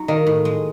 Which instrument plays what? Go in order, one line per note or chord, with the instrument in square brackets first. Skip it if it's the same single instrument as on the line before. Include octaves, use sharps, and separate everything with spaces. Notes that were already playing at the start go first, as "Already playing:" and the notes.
Already playing: [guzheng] F#3 D#4
[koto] D#3 [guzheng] A#3
[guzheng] A2
G#3